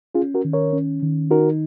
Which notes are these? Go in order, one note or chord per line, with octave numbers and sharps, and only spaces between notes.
C#4 F4 G#4
F#4 A#4
D#3
A#4 C#5
C#4
D#3
D#4 F#4 A#4